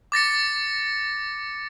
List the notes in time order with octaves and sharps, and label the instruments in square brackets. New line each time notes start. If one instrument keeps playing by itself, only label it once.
[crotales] D6 A6 A#6 C#7